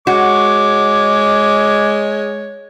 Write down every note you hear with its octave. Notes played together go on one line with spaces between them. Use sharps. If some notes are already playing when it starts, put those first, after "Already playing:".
G#3 F#4 C#5 D6